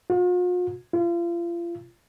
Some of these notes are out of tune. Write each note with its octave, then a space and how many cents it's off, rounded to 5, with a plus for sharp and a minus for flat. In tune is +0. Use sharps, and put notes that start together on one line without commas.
F4 +45
F4 -35